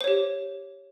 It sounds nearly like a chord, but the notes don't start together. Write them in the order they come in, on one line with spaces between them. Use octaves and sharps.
C5 C#5 G4